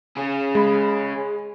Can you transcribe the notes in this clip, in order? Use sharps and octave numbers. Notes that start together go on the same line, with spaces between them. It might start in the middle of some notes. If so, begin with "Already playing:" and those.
C#4 G#4
G#3 B5